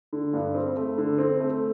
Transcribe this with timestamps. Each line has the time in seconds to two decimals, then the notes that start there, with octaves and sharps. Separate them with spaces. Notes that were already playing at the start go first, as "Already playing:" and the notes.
0.13 D3
0.33 G2
0.55 C4
0.77 A3
0.98 D3
1.18 C4
1.40 A3